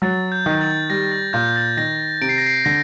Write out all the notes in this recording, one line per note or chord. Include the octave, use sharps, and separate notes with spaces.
F#3 A6
G6
D#3
A6
G3 A#6
A6
A#2 G6
A6
D#3 A#6
C3 D7
C7
A#6
C7
D3 A#6